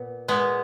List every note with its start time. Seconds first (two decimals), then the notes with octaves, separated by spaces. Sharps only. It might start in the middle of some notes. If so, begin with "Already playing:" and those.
Already playing: A#2 B3
0.28 A#2 G#3 B3